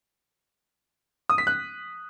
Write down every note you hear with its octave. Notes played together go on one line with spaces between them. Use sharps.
D#6
B6
F#6